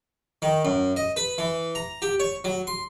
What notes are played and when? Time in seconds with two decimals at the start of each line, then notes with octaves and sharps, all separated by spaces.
0.42 D#3
0.65 F#2
0.97 D#5
1.16 B4
1.38 E3
1.75 A#5
2.02 G4
2.20 C#5
2.44 F#3
2.67 C6